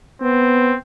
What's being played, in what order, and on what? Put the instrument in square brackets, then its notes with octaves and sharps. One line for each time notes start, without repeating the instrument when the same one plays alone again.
[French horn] B3 [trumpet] C4